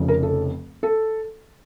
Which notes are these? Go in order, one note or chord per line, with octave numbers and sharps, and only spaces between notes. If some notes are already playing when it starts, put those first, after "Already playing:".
Already playing: F1 F2 C#3
A#4
A4
A4